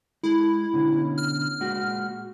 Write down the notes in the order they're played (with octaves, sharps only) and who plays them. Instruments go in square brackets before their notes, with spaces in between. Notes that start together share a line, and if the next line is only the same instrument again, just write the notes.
[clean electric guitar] G#3 [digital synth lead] E4
[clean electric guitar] B2 D3 C#4
[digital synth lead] F6
[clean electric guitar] A#2 G#3 F#4